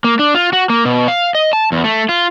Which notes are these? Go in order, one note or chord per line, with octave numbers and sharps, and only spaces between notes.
A#3
D4
F4
F#4
A#3
B2
F5
D#5
A5
E2
A3
F4